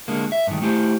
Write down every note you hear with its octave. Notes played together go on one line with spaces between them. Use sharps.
D3 G#3 A#3
E5
G2 D#3
A3 E4 G4 C5